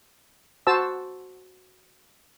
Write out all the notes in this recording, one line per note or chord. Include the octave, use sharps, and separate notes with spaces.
F#4 C5 A5 E6